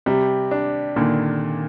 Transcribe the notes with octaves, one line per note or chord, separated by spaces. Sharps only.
C3 G3
D4
A#2 D3 D#3